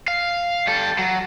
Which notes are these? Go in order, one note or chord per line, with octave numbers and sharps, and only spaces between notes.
F5
G3 A4
F#3